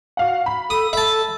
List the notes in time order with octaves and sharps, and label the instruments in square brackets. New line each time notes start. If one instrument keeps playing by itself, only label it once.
[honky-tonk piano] F#4 F5 F#5
B5
[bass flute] A4 [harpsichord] D#6
[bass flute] A4 [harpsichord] E5 A5